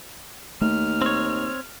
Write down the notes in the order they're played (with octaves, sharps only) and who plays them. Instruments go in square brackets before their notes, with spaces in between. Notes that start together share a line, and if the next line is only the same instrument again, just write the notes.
[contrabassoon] D#2 [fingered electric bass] A3 [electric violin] F6
[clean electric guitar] C4 C#5